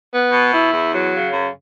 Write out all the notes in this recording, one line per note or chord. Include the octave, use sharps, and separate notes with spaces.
B3
B2
E4
E2
F#3
C#3
F#2